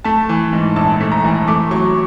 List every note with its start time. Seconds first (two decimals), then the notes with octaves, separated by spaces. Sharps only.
0.04 A3 A5
0.29 E3
0.53 G#2
0.76 A#1 A5
1.01 A3
1.12 A#5
1.24 E3
1.47 A3 D6
1.71 F#3 C#6